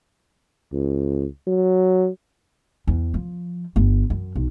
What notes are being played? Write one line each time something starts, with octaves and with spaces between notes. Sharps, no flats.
C#2
F#3
E2
F3
G1
F#2
B1